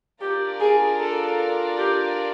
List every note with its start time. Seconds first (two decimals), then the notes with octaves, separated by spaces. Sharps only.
0.21 D4 F4 G4 A#4 D5
0.60 G#4
1.00 A4
1.78 G4